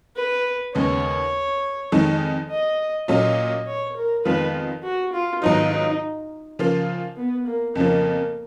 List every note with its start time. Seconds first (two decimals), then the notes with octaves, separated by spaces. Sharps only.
0.16 B4
0.75 D#2 C#3 G#3 B3 C#5
1.92 F2 D#3 G#3 D#4
2.51 D#5
3.08 A#2 F#3 C#4 F4 D#5
3.67 C#5
3.97 A#4
4.25 F2 D#3 G#3 B3 F4 B4
4.83 F#4
5.13 F4
5.42 G#2 D#3 F#3 B3 D#4 F4
5.72 D#4
6.59 C#3 F3 A#3 F4
7.17 B3
7.47 A#3
7.75 F2 C#3 F3 A#3